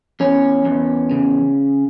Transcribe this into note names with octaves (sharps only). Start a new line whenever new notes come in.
E2 C#4
E2
C#3